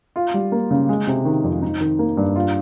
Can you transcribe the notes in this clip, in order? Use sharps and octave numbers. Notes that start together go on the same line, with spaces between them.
F4
G3
A#3
C#3
G#3
C3
D#3
F2
D#4
D#3
A#3
G2
F4